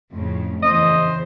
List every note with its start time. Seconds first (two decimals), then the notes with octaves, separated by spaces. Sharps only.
0.11 F2 A2 C#3
0.62 E2 C#3 C5 D#5